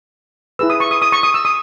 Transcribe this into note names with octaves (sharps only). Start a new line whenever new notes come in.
E4 G#4 B4 E6
D#6
C#6
D#6
D#6
C#6
D#6
E6
D#6